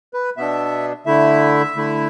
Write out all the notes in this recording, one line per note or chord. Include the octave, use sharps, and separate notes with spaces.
B4
B2 B3 D4 E5
D3 A3 E4 E5
D3 A3 E4